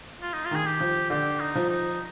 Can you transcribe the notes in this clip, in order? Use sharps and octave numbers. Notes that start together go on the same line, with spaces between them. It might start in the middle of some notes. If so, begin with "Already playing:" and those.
F4
D#4
F4
D#3 G#4
G4
F3
D3 G4
D#4
F3
D#4